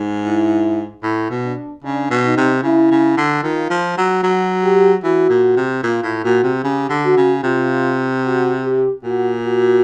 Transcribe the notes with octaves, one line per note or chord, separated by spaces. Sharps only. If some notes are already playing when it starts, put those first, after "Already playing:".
Already playing: G#2
E4
A2
B2
D4
C#3 D4
B2
D#4
C3
C#3 E4
C#3
D3
D#3 F4
F3
F#3
F#3 F#4
G4
E3 F#4
A#2
C3
A#2 F4
A2
A#2 F#4
C3
C#3 G4
D3
F#4
C#3
C3 F4
F#4
G4
A#2 F#4
F#4